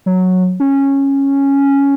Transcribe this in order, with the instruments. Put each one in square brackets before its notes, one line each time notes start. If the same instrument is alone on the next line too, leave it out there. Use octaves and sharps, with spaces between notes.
[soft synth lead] F#3
C#4